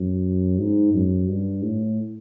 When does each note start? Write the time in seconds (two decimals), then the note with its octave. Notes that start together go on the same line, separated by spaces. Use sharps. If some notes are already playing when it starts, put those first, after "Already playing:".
Already playing: F#2
0.59 G#2
0.94 F#2
1.28 G2
1.63 A2